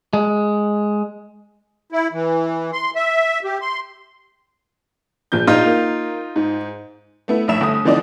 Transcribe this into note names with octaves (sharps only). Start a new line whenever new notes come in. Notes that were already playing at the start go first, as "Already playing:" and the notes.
G#3
E4
E3
C6
E5
G4
C6
A#1 F3 G6
A#1 D#4 F4
A#3
G#2
A3 B3 E4
A#1 A2 E5 E7
G1 A3 D#6
D3 E3 F3 C4 D#4 D5